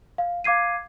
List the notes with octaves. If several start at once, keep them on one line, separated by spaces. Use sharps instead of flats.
F5
F5 D6 G#6 C7 D#7